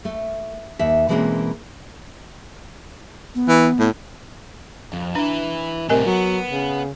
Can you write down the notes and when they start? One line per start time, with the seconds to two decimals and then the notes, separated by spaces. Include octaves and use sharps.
0.05 A3
0.79 D#2 E5
1.09 B2 E3 G#3 A#3 C4 C#4
3.35 B3
3.48 E3
3.79 A2
4.93 F2
5.15 D4 E4 B4
5.89 A2 C3 G3 A#4 D#5 G#5
6.05 F#3 B3
6.51 C#3